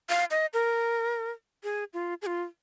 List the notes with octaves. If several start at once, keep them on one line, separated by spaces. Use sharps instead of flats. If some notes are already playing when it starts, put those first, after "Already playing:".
F5
D#5
A#4
G#4
F4
G#4
F4